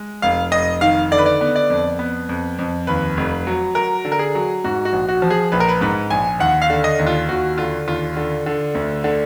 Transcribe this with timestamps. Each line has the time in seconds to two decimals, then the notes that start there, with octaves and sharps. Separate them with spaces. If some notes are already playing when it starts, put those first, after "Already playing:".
Already playing: G#3
0.22 F1 F5
0.52 F1 D#5
0.81 D#3 F5
1.11 D3 D5
1.18 B4
1.26 D5
1.41 B3
1.56 D5
1.70 F2
1.99 B3
2.29 F2
2.59 F2
2.87 D#2 B4
3.17 F1
3.47 F#3
3.75 F#3 A#4
4.05 D3
4.12 A#4
4.19 G#4
4.35 F#3
4.64 G#2 F#4
4.85 F#4
4.93 A#1
5.09 F#4
5.22 F3
5.30 G#4
5.52 A#1 B4
5.60 A#4
5.69 B4
5.81 G#2 B4
6.10 A#1 G#5
6.40 D#2 F#5
6.62 F5
6.70 D3
6.84 D#5
6.99 D#2
7.07 F4
7.29 D#2 F#4
7.58 D3 F4
7.87 D#2 F4
8.16 D3
8.46 D3
8.75 D2
9.04 D3